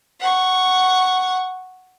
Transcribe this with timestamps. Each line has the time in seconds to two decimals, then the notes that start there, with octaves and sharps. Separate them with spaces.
0.20 F#5 C#6